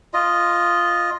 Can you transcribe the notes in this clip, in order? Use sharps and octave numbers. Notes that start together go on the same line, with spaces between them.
F4 D#5